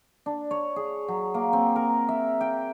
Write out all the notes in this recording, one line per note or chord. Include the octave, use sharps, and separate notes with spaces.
D4
C#5
G#4
F#3
A#3
C4
A#4
E5
G5